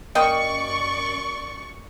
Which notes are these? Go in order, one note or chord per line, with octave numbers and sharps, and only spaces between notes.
F#2 A#3 D5 D#5 G5 C#6